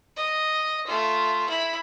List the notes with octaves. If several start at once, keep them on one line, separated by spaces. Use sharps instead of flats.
D#5
A3 F4
E4 B5